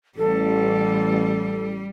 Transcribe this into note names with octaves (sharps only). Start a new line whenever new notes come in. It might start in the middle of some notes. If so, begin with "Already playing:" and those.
A1 G3 A4